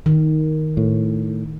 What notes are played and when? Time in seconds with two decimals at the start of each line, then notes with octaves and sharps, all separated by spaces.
0.06 D#3
0.77 A2